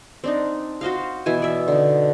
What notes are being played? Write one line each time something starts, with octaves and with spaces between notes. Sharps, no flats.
C4 D4 D#4
F#4 C5 D#5 F5
B2 E3 E5 G#5
D5 E5
D3 D#4